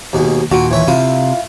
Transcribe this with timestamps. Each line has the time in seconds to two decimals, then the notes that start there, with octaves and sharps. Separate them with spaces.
0.13 D#2 B2 G#3
0.52 D#2 A#2 F#4
0.71 E3 C#5 E5
0.88 C3 E4 F4 F5